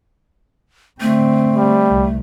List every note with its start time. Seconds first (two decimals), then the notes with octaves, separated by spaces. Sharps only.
1.01 D3 A3 C4
1.56 G3
1.88 C2